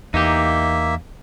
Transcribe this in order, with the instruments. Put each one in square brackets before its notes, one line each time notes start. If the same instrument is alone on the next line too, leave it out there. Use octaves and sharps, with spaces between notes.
[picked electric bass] E2 [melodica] A#3 E5 [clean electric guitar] D#4 G4